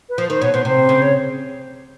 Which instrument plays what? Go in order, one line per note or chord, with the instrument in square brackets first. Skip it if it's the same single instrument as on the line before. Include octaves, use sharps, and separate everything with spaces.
[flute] B4
[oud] F3 [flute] C5
[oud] D#3 [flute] C5
[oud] B2 [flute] C#5
[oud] B2 [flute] C5
[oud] C3 [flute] C5
[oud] C#3
[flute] C#5